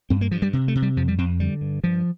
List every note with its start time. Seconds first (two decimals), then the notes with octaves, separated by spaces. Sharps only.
0.10 G2 C4
0.21 A#3
0.31 G2 F3
0.42 G3
0.53 C3
0.68 A3
0.75 C3
0.82 G3
0.97 F2 F3
1.08 G3
1.18 F2 C4
1.40 D3 G3
1.61 G2
1.84 G2 F3